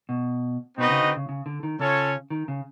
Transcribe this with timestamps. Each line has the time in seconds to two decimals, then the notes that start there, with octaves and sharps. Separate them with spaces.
0.09 B2
0.78 B2 C4 D#4 F#4 B4 D#5
0.90 C#3
1.03 D3
1.16 C#3
1.29 C#3
1.46 D3
1.63 D#3
1.80 C#3 C#4 F4 A4 C#5
2.30 D#3
2.48 C#3